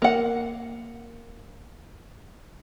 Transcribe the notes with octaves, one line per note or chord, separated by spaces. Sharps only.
A#3 F#5